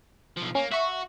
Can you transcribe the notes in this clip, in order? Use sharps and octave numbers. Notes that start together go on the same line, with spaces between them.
B1 F3
A#3 C#4
F#4 E5 C#6